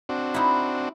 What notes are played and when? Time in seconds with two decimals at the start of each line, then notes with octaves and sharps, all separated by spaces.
0.09 C4 D4 F#4
0.34 D#4 E4